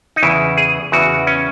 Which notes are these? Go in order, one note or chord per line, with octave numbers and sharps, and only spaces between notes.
D#4
E2 C#3 E3 E4
G#4
E2 C#3 E3 F#4
C#4